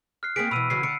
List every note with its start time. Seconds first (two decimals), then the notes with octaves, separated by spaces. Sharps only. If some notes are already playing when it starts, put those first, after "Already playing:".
0.23 F6 F#6 C7
0.36 A#3 C4 G#4 B6 D7
0.51 B2 E3 B5 E6 D#7
0.70 C#3 E3 F#3 C7
0.83 D3 C#7 D7